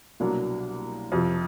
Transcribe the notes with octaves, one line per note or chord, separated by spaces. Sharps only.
C2 B2 F#3 A#3 D4
F2 C3 F3